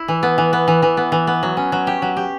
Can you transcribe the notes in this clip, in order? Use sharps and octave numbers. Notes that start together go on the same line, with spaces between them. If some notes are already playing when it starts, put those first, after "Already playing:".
Already playing: E4
E3
B3
E3
B3
E3
E3
B3
E3
B3
F#3
C#4
F#3
G4
F#3
G4